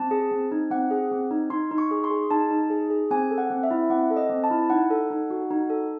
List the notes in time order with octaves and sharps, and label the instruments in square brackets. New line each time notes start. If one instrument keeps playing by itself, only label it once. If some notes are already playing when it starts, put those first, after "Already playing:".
Already playing: [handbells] C4 A5
G#4
C4
D#4
C4 F#5
G#4
C4
D#4
D#4 C6
D#4
C#6
G#4
C6
G#4
D#4 A5
D#4
G#4
G#4
C4 G#5
A4
F#5
C4
E5
E4
C4 F#5
A4
D#5
C4
A5
E4
D#4 F#5
A4
D#4
F#4
D#4
A4